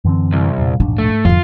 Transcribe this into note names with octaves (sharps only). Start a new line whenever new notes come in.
F#2 D3 E3 C4
C2
E2 A#2 G3
E1 A#1 G#2 G#3 D4
A3
F2 D3 F3 F4